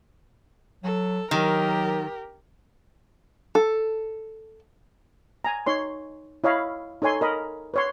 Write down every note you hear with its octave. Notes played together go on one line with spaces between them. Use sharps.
F#3 A4
D#3 F#3 G4 A#4
A4
G#5 A#5
D#4 C#5 C6
E4 C#5 D#5 F5 B5
D#4 A4 C#5 G#5 C6
A#4 D#5 B5
B4 C#5 C6